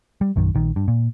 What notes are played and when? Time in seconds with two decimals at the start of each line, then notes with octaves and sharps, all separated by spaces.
0.21 G3
0.36 A#1 F#2 D#3
0.54 A#1 D#3
0.76 G2
0.88 A#2